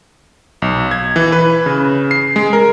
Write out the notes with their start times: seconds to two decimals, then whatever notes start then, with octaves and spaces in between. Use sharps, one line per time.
0.62 B1
0.91 G#6
1.16 E3
1.32 B4
1.66 C#3
2.11 C7
2.36 G#3
2.53 A#4